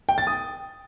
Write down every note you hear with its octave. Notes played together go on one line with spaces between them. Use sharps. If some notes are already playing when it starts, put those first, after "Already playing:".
G5
A6
D#6